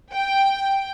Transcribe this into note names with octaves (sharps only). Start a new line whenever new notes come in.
G5